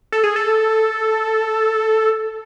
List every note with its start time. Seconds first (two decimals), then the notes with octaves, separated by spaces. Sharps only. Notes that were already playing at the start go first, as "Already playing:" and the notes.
0.12 A4
0.24 G#4
0.36 A4